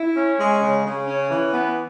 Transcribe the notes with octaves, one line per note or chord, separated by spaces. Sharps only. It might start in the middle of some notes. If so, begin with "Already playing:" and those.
Already playing: E4
C#4
G#3
C#3
C#3
C#4
E3
B3